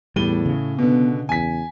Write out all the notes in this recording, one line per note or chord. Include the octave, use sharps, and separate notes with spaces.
E2 A2 G3 D#7 G7
C#3
B2 D3 B3
E2 G#5 B6